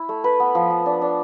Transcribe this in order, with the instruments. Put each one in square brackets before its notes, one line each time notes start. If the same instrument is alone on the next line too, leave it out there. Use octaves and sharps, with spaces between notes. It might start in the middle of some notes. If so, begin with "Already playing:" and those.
Already playing: [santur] E4
A3
B4
B3
F3
F3
D4
D4